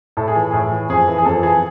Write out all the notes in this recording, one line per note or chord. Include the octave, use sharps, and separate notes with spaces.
A2 A4
G#4
E3
A2 G#4
E3
F2 G#4
E3
G#4
F2 A4
E3 G#4